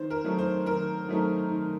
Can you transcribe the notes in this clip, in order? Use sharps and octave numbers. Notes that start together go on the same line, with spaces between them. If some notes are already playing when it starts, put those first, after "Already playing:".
Already playing: D#3 C5
A#4
F#3 A3 C4 D#4
C5
D#3 A#4
F#3 A3 C4 D#4
D#3